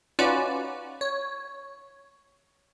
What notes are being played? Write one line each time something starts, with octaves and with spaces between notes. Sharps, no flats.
C#4 D#4 F4 F#4 B4 D5
C#5